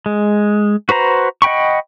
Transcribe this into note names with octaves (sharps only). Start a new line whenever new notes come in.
G#3
F#4 B4 C5 A#5
D#5 F#5 G5 B5 C#6